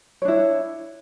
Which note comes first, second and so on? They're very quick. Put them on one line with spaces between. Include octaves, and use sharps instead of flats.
C#5 D4 E4